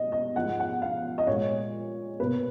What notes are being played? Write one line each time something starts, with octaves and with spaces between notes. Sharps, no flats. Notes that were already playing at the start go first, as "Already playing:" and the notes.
Already playing: B2 A#3 D#5
D#5
G#2 F3 G#3 F#5
F#5
F5
D#5
A#2 G#3 C#5
B2 A#3 B4